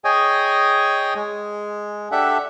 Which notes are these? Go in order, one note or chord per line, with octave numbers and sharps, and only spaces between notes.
G#4 C#5 D#5 G5 G#5 D#6
G#3
D4 G4 A4 E5 F#5